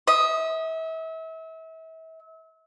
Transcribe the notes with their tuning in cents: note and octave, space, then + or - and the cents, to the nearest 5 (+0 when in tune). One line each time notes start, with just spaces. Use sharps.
E5 -35 D#6 +0